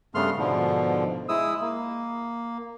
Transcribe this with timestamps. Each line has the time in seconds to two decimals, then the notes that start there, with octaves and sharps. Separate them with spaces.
0.15 G2 C#3 A3 B3 C6 F6
0.38 G#2 B2 D3 F3
1.29 G#3 E4 D#6 E6
1.61 A#3